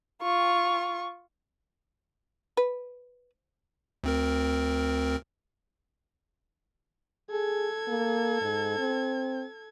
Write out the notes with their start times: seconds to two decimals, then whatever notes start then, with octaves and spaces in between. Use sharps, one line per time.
0.22 F4 C#6
2.57 B4
4.04 D2 C4 A#4
7.30 G#4 A4 G#6
7.88 A#3
8.41 G#2
8.79 C4